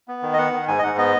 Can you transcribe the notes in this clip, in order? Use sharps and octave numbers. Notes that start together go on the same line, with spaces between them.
B3
D#3
D#5
B3 F#5
D#3
G#2 G#5
D#5
G#2 F#5
B3 D#5